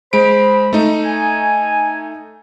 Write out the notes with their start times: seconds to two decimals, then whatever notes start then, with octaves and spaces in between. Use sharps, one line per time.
0.13 G#3 C5 B5 D7
0.73 A3 D#4
1.04 G#5